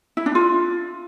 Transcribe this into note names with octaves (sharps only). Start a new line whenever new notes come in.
E4
D4
F4